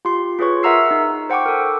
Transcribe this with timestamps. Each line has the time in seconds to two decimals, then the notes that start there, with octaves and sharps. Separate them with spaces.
0.05 F4 G4 C6
0.39 F4 G#4 B4 C#5 C#6
0.63 A#4 E5 F#5 A#5 E6 C7
0.91 D#4
1.30 C5 F#5 G5 C#6 D6
1.46 A4 A#4